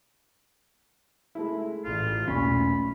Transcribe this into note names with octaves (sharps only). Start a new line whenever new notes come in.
G#3 A3 E4
A1 F4
E1 B1 A#2 A3 C#4 B5 C#6